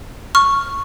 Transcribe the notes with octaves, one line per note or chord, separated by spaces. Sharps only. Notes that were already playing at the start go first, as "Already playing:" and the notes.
C#6 F6